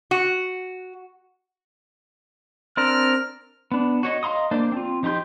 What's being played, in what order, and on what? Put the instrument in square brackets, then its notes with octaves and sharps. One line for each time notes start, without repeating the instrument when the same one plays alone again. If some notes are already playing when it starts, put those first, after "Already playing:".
[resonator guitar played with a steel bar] F#4
[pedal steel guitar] C4 D4 A#4 [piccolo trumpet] F6
[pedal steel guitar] B3 D4
F#4 C#5 D#5
D#5 F5 A#5 C6 D#6
A#3 D4 C5 D5
C4 F4
F3 D#4 G4 C6 G6